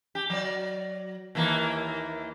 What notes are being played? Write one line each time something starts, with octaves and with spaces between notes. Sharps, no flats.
G4
F#3 D5
D#2 E3 A#3